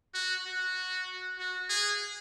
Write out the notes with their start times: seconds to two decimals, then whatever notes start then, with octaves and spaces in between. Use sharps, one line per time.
0.14 F#4
0.45 F#4
1.38 F#4
1.70 G#4